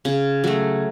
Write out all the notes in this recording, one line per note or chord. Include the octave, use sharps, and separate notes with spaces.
C#3
F#3 A3